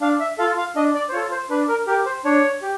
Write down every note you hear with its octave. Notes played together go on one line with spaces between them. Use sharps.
D4 F5
E5
F4 A4 F5
F5
D4 D#5
D5
C5
F4 A4 C#5
C5
D4 B4
A#4
G4 A#4
C5
D4 C#5
G4